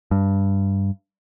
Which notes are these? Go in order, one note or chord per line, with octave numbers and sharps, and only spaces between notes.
G2